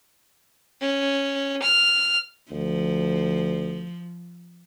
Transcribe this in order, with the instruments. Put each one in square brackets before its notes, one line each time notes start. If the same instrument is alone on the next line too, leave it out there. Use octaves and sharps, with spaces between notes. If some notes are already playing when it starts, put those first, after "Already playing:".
[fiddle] C#4
F6
[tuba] D2 [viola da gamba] F3